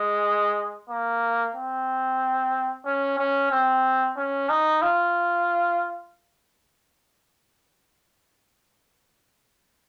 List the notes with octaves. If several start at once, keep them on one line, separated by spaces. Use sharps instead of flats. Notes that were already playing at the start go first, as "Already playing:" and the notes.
Already playing: G#3
A#3
C4
C#4
C#4
C4
C#4
D#4
F4